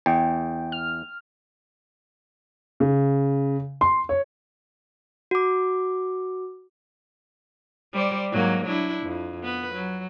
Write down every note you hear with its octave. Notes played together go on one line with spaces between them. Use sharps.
E2 G5
F6
C#3
C6
C#5
F#4 D6
G3 C5 D5
G#2 F#3 A#3
F#3 D4 E4
F2
B3 B4
F#3